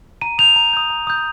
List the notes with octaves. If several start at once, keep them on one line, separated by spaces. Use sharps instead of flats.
A#5 D#7
D#6 G6 F7
A#5
D#6 G6
A#5
D#6 G6